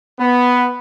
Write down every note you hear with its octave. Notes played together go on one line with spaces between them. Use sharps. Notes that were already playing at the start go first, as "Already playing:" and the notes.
B3